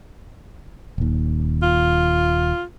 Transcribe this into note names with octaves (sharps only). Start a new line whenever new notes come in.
D#1 D#2
F4